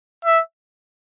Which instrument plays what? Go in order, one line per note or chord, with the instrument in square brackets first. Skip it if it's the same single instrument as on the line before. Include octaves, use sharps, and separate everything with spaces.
[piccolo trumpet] E5